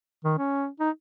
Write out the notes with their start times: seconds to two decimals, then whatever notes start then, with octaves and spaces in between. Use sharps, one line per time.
0.24 D#3
0.38 C#4
0.80 D#4